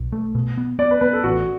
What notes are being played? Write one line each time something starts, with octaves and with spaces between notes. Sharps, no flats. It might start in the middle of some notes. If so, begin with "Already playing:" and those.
Already playing: B1
A3
B2
B3
B3 D5
B4
B3 B4
A4
A1 F#4